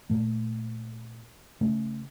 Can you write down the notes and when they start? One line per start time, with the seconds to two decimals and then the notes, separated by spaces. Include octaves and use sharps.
0.10 A#2 A3
1.61 C#3 A3 C#4